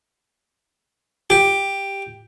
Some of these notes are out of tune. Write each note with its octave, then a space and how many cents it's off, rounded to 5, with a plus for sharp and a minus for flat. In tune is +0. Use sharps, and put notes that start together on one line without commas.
G4 +5